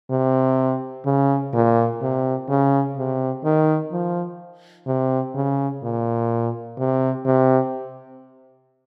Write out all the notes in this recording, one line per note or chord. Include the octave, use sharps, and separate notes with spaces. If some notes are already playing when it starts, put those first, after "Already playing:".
C3
C#3
A#2
C3
C#3
C3
D#3
F3
C3
C#3
A#2
C3
C3